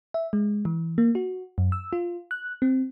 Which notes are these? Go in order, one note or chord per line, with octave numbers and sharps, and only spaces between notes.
E5
G#3
E3
A#3
F#4
F#2
E6
F4
F#6
C4